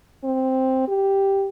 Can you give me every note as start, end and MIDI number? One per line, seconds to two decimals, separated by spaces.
0.24 0.86 60
0.87 1.48 67